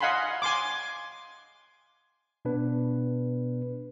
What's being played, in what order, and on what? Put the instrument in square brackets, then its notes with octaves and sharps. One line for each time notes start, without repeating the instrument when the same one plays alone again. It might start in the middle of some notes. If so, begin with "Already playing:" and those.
[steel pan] D#5 F5 F#5 G#5 B5 C6
G#5 C6 D6
[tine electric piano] B2 B3 D4 B4